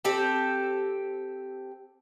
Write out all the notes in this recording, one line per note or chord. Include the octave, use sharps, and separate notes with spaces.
C4 G4 A4